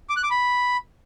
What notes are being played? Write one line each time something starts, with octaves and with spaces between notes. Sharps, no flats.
D6
F#6
D6
B5